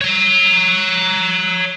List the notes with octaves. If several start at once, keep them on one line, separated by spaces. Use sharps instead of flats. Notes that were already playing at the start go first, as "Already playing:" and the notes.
C#5 A#5